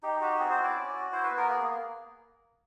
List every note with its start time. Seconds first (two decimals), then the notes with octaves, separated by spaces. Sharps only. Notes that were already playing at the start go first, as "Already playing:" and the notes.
0.03 D#4 G4
0.21 F#4 G4
0.39 C4 G#4
0.51 C5
0.57 E4
0.63 D5
0.75 C#4
0.94 F#4
1.13 E4 C5
1.24 B4
1.31 B3
1.37 A#4
1.48 A#3 G#4